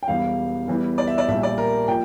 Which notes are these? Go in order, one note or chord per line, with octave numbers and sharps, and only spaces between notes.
G5
E1 E2 E3 G3 F5
E2 E3 G3
D5
E5
D5
A#1 A#2 G3 E5
D5
A#4
A#2 F3 G5